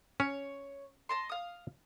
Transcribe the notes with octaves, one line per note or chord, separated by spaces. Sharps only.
C#4 C#5
D#5 A5 C6
F5 D#6